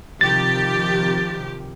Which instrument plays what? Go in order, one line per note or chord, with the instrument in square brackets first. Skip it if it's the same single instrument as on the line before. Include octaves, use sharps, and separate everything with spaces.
[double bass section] C3 D#3 F3 [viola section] G4 [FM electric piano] A6